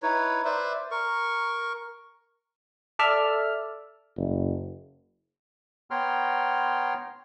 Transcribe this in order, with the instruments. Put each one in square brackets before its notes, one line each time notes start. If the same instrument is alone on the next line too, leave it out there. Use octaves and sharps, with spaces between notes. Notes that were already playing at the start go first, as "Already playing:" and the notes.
[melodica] D#4 E4 B4 C#5
B4 C5 D5 E5
A#4 C#6
[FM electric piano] A4 D5 E5 F6
[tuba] F#1
[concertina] B3 C#5 G5 A#5 C6 F6